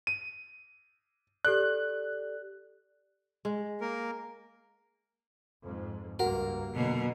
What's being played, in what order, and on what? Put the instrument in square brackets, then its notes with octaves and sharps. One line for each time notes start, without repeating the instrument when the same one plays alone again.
[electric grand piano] D#7
[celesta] G4 A4 D5 [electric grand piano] F#6
[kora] G#3
[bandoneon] A#3 A#4
[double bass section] F2 G#2
[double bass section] C#2 G2 A#3 [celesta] F#4 F#5 [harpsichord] A#4
[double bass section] F1 D3 F#3 [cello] B2 A#3